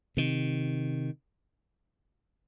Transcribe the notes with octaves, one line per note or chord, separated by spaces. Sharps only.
C3 D#3